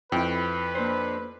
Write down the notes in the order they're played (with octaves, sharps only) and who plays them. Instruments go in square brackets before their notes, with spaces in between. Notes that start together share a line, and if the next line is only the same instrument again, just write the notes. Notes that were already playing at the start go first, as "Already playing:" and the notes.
[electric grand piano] F2 [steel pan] E4 G5 [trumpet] B4
[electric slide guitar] A#3 D4 C5